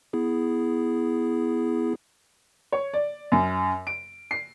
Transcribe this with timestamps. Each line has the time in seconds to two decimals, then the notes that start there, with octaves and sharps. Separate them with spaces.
0.13 B3 E4 G#4
2.72 C#5
2.94 D5
3.32 F#2
3.87 D7
4.31 C7